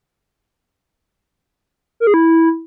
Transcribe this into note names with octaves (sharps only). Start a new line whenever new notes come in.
A#4
G#4
E4